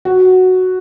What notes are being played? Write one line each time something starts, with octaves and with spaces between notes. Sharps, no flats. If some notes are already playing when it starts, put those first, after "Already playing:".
F#4